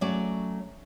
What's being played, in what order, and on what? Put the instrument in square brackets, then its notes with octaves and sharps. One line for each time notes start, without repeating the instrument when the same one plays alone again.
[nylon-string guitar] F#3 A3 C#4 F#4 D5